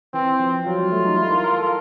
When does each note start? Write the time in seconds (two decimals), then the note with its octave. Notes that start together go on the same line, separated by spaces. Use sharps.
0.13 E3 C4
0.40 F3
0.65 F#3 F4
0.79 G3
0.92 A3
1.05 D#4
1.18 E4
1.31 A#4
1.44 A#4
1.57 A4